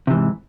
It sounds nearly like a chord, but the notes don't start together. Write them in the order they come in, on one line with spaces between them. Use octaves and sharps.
C3 E3 G#2